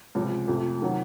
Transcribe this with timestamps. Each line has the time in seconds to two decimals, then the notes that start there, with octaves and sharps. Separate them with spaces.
0.15 C#2 C3 F3
0.48 F2 C3 F3 A3
0.81 C3 D#3 F#3